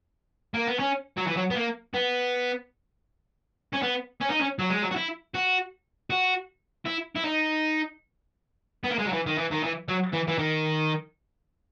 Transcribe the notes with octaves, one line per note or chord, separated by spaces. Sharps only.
A#3
B3
C#4
F#3
E3
F#3
B3
A#3
B3
C#4
B3
C#4
D#4
C#4
F#3
G#3
F#3
F#4
E4
F#4
F#4
E4
E4
D#4
B3
A#3
G#3
F#3
E3
D#3
E3
D#3
E3
F#3
E3
E3
D#3